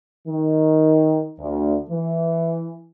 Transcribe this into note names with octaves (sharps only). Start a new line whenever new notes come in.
D#3
D2
E3